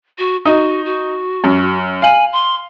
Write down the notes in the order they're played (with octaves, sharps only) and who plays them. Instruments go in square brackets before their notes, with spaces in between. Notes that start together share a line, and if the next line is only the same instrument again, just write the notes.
[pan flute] F#4
[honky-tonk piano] D#4 [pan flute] F#4
[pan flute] F#4
[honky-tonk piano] F#2
[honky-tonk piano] F5 F#7 [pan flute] G#5
[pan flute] C6